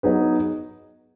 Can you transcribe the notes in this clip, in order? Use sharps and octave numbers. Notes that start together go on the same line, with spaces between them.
F#3 B3 D#4 G#4 B4